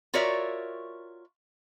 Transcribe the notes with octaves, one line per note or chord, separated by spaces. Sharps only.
F4 F#4 A#4 C#5 D5 E5